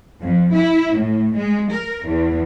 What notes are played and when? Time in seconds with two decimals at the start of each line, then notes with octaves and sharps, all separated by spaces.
0.21 F2
0.52 E4
0.95 A2
1.35 G#3
1.70 A#4
2.06 E2